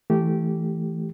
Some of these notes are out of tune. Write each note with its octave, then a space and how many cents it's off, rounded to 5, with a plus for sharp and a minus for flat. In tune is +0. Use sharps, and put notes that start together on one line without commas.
E3 +0 A3 +0 G4 -15